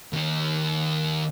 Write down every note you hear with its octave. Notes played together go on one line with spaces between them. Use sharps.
D#2 D#3